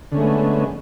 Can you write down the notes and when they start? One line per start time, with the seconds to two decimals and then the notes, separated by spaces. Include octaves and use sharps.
0.12 D3
0.14 C#4
0.17 A3
0.19 G#3
0.22 B3